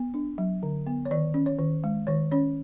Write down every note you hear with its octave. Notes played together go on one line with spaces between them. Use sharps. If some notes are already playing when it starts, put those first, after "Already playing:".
Already playing: B3
D4
F#3
D3
B3
C#5
D#3 D5
C#4
C#5
D#3
G#3
D#3 C#5
C#4 C#5